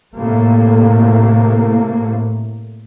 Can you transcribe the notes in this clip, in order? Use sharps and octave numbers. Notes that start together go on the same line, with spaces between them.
A2 C3 A3 A#3